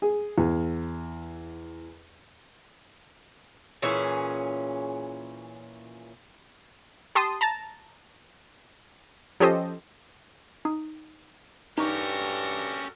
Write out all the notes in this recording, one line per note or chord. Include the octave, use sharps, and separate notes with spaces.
G#4
E2
A#2 E3 C#4 G#4
G4 A5 C6 D#6
A5 A#5 A6
F3 C#4 G4 A4 C5 D#5
D#4 D#6
G2 C#4 D#4 F#4 G4 A4 A#4 C#6